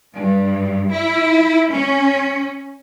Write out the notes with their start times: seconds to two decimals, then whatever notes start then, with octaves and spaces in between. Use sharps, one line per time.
0.15 G2
0.91 E4
1.71 C#4